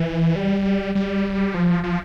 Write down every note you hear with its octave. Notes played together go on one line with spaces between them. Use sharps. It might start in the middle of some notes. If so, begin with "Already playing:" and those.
Already playing: E3
G3
G3
F3
F3